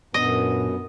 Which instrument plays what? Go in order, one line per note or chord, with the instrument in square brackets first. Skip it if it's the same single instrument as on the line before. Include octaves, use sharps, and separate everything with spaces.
[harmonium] F#2 [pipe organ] A#2 D4 [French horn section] B3 [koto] D#5